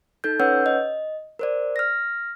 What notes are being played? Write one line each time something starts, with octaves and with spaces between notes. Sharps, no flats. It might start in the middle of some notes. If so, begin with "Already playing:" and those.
D#4 A4 G6
C#4 B4 C#5 F#5 E6 G6
D#5
A#4 C5 D5
F6 A#6